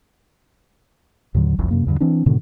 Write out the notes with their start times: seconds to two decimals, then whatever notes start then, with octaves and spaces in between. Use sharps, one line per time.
1.34 D#2 A2 D3 F#3
1.58 F#1 C2 F2
1.71 F#2 C3 A#3
1.86 E2 G2 D3
2.00 E3 C4 D4
2.26 G#2 B2 D3 D#3